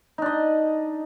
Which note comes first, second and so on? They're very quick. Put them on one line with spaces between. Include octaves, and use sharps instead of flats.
D#4 D4 D#5